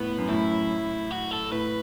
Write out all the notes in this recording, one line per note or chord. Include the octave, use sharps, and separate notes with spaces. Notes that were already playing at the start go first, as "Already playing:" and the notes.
Already playing: A2 B3
F#2
A2 E4
F#4
A4
A2 B4